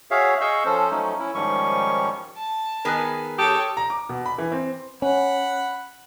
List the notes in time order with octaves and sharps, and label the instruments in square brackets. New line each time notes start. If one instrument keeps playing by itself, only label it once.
[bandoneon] F#4 G#4 C#5 E5 F5
G#4 D#5 F5 C#6 E6 G6
F3 C#4 A4 C5
F3 F#3 A3 C#4 D#4
C#4 E4
G#2 D#3 F3 G3 C#4 C#6
[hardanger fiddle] A5
[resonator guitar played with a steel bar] D#3 B3 G#4 [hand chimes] A#4 F#6
[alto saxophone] G4 [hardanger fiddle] A4 C#5 [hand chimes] D#6
[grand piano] A#5
D6
B2
B5
E3
C4
[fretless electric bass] C#4 [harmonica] F#5 B5